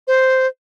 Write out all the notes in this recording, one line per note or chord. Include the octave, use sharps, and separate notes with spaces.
C5